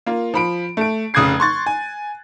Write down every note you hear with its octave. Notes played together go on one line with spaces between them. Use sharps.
A#3 F4
F3 B5 D7
A3 D7
F1 C#3 D#6 F#6 G#6 C7
C6 C#6 A6
G#5